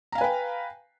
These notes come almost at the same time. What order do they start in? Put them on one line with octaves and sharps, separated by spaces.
A#5 F5 G#5 B4 G5